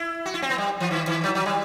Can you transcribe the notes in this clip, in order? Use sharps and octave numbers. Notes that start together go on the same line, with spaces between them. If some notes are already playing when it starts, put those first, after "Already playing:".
Already playing: E4
F#4
E4
C4
B3
G3
E3
D#3
D#3
F#3
F#3
G3